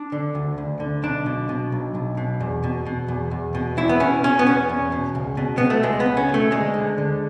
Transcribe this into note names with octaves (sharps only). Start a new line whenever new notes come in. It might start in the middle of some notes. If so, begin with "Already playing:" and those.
Already playing: D4
D3
D2
D2
D3
B1 D4
B2
B2
B1
B1
B2
E2
B2
B2
E2
E2
B2
E2 E4
B3
B2 C#4
B2 C#4
B3
E2 C#4
E2
B2
C#2
B2
B2 B3
A3
C#2 G#3
B3
C#2
C#4
B2 A3
D2 G#3
D3
D3